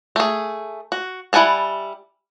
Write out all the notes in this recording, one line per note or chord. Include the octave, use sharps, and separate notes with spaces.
A3 G#4
F#4
G3 E4 F#5 G#5 A5